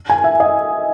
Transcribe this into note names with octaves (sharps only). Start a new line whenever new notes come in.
G#5
E5
D#5